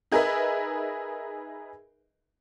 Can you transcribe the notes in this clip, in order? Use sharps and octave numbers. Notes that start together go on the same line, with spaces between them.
D#4 G#4 A#4 B4 D#5 E5